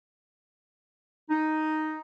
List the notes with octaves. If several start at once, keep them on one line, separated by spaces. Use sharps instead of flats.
D#4